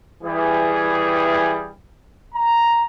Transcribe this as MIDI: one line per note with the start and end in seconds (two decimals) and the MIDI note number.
0.23 1.72 52
0.23 1.72 55
0.23 1.72 68
2.35 2.85 82